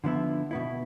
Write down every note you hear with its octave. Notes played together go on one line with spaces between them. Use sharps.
D3 F3 B3 E4
B2 B3 E4